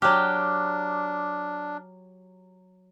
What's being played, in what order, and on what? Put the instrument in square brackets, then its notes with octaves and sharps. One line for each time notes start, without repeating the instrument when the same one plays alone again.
[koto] F#3 G4 [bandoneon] D4 [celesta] D6 F6 F#6